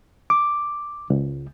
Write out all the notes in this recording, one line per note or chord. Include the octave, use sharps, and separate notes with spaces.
D6
C#2